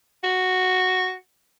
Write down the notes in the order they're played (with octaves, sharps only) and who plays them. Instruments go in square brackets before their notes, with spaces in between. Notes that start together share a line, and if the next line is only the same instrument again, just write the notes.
[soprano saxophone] F#4